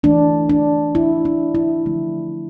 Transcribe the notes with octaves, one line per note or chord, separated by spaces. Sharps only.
E3 A3 D4
D4
E4
D4
E4
D3 F3 A3